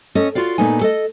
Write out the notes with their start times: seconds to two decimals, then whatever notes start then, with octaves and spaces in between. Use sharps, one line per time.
0.15 C#4 A4 D#5
0.35 F4 F#4 D5 F5
0.58 A#2 A3 B3 D#4 G#5
0.81 A4 D#5